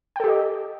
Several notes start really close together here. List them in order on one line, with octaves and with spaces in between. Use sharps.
G5 A4 G4 D#5